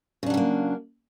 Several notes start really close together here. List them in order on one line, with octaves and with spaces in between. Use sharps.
C#3 D4 F#3 G3 A#3